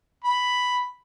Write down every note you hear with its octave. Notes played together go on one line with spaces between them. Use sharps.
B5